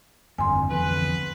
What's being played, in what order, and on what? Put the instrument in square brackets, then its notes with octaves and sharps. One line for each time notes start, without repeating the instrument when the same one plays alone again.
[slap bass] G1 F2 F3 [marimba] G#5 C6
[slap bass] F2 D3 E3 [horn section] B3 B4